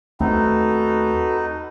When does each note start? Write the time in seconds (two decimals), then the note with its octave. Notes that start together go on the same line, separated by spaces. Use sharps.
0.21 D#2 A3 C4 D#4 F#4 A4 B4